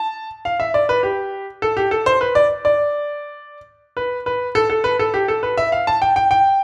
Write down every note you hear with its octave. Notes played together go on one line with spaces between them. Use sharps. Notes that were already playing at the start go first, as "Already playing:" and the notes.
Already playing: A5
F5
E5
D5
B4
G4
A4
G4
A4
C5
B4
D5
D5
B4
B4
A4
A4
B4
A4
G4
A4
B4
E5
F5
A5
G5
G5
G5